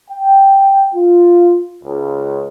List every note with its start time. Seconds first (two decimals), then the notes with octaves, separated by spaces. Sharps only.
0.10 G5
0.94 F4
1.84 C#2